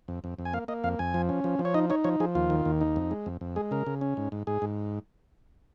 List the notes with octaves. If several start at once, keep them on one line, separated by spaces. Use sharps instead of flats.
F2
F2
F2
G#5
A#3 F5
A#3 D#5
F2 F5
F2 G#5
F3
C#4
F3
F3
C#5
D#4 D#5
D#4 C#5
F3 C#5
F3 G#4
D#2 F4
D#3
D#2
D#4
F2
G#3
F2
F2
G#3 G#4
C#3 A#4
C#3
C#4
G#2
G#2
G#2 G#4
G#2